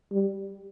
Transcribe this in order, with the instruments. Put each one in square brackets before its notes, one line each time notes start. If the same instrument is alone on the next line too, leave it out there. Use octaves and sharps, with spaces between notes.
[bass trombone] G3